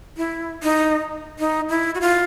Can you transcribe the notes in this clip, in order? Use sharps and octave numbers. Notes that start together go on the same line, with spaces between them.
E4
D#4
D#4
E4
F#4
F4